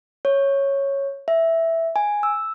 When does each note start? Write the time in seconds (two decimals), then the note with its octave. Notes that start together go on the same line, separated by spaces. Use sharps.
0.25 C#5
1.28 E5
1.96 G#5
2.23 E6